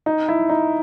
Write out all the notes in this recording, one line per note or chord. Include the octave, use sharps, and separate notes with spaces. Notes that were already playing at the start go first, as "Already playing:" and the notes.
D#4
E4
D#4